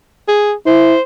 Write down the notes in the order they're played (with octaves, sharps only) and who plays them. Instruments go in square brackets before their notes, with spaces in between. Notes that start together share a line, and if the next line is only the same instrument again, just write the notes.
[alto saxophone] G#4
[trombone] E4 [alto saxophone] C5